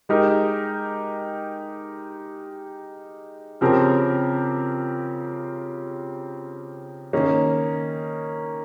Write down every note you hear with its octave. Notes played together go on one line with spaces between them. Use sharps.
G#3 D#4 G4 A#4
C#3 F3 C4 G4 A#4
D#3 A#3 C#4